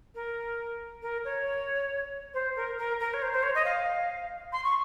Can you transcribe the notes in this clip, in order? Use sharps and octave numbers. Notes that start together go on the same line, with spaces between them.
A#4
A#4
C#5
C5
A#4
A#4
A#4
C#5
C5
C5
C#5
D#5
F5
C6
C#6